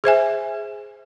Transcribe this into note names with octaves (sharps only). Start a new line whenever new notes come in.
G#4 C5 E5 G#5